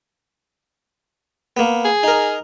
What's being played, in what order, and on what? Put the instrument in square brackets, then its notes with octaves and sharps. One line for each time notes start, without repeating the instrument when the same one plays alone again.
[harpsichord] A#3 B3
[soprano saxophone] G#4
[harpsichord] D#4 A#4